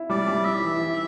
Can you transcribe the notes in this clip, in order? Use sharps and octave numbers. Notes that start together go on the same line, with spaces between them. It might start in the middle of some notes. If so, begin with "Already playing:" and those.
Already playing: E4
G3 D5
G3
E4 E5
E3
E4